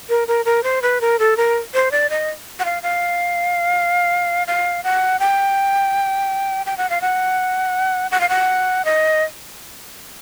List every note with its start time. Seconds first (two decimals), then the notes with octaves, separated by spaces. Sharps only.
0.09 A#4
0.28 A#4
0.45 A#4
0.63 C5
0.82 B4
1.01 A#4
1.19 A4
1.37 A#4
1.74 C5
1.91 D5
2.10 D#5
2.59 F#5
2.65 F5
2.83 F5
4.47 F5
4.84 F#5
5.20 G5
6.66 G5
6.77 F#5
6.90 F5
7.01 F#5
8.11 F#5
8.21 F5
8.29 F#5
8.85 D#5